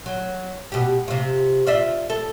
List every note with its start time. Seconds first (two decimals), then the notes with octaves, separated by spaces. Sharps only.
0.06 F#3
0.72 B2 G4
1.08 C3 F4
1.66 F4 D5 E5
2.10 A4